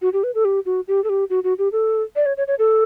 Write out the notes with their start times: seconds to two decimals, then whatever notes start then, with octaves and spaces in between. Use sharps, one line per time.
0.02 F#4
0.13 G4
0.24 B4
0.35 A4
0.45 G4
0.66 F#4
0.88 G4
1.04 A4
1.09 G4
1.30 F#4
1.44 F#4
1.59 G4
1.72 A4
2.16 D5
2.26 C#5
2.37 C#5
2.48 C#5
2.59 A4